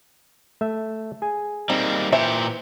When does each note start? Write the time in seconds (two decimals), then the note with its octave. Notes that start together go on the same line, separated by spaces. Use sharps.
0.61 A3 E5
1.22 G#4 G#5
1.69 G3 A#3 C4 D#4
2.12 A#2 E3 G4 C5 E5